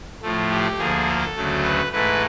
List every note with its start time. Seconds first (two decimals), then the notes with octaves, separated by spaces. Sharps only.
0.22 A2 F3 A3
0.51 G4
0.79 D2 D3 F3 A#3 G#4
1.08 A4
1.36 D2 C#3 F#3 A3
1.64 B4
1.92 G#2 E3 A3 B4